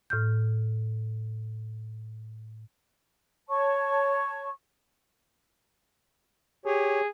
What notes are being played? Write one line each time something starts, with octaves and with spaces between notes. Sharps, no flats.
A2 F6 G6
C#5 A5 C#6
G4 G#4 C#5